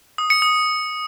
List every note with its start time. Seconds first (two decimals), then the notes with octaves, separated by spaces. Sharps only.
0.18 D#6
0.30 C#7
0.42 D#6